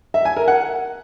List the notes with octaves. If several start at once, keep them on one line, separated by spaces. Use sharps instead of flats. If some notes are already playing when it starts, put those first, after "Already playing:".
E5
G#5
A#4
F#5